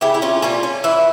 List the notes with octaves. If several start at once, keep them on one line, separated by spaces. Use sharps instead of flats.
C#3 E4 G4
E4
C#4 F4
G3 A#3 C#4 F4
C#4
E3 E4